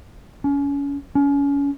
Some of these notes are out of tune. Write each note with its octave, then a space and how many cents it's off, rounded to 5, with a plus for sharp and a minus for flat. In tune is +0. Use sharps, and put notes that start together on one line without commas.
C#4 +30
C#4 +30